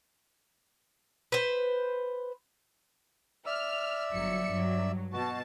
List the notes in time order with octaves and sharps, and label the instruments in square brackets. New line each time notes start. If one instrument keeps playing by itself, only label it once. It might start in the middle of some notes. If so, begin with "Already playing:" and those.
[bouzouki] B4 C5
[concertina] D5 E5 E6 [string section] F6
[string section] G1 F#3 C#7
G2 F#3
[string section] B2 A5 [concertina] F#4